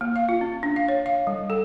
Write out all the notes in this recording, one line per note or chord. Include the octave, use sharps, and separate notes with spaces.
A#3
F5
F4
C#4
D4
F5
C#5
F5
G3
A4